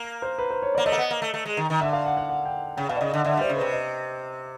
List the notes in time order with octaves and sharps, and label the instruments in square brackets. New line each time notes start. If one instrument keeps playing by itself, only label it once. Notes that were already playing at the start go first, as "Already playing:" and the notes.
Already playing: [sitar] A#3
[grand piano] C5
B4
C5
C#5
D5
[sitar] A#3
[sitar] A3 [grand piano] D#5
[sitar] A#3
B3
A#3
A3
A3
G#3
D#3
D#3
[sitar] D3 [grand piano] E5
[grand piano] F5
F#5
F#5
F#5
G5
[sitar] C#3 [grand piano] G5
[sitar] B2 [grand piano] F5
[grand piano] D5
[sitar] C#3 [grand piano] D#5
[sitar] D3 [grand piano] D#5
[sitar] D3 [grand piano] E5
[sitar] G3 [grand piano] C5
[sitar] C#3
[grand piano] B4
[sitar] C3
[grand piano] D#5